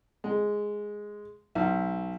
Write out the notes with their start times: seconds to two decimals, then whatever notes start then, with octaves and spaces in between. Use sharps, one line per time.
0.24 G#3
1.55 B1